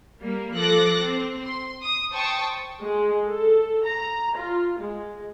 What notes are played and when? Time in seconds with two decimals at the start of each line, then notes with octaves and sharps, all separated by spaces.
0.21 G3 A#3
0.56 F3 A4 D6 F#6 A#6
1.01 C4
1.44 C6
1.83 D#6
2.11 C5 G5 A5 C#6 D#6
2.82 G#3
3.27 A4
3.86 A#5
4.38 F4
4.80 G#3